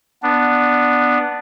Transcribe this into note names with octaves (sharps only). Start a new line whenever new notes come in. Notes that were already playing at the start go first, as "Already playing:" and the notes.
B3 D4